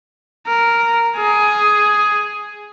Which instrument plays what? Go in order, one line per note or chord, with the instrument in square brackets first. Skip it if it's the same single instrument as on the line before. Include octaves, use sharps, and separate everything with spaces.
[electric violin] A#4
G#4